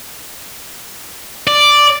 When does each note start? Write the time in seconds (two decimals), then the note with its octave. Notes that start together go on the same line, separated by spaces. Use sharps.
1.47 D5